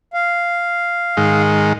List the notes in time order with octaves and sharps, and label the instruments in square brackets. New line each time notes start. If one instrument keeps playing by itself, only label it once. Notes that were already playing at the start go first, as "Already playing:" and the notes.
[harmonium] F5
[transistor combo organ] G#2 D#3 G#3